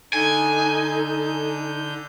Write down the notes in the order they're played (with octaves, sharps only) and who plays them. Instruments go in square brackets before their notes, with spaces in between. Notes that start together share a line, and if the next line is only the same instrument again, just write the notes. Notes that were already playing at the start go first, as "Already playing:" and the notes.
[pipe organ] D3 G6 [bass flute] D#4 [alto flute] A4 [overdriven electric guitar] G#5